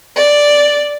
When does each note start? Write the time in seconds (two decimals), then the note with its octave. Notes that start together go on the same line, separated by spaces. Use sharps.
0.16 D5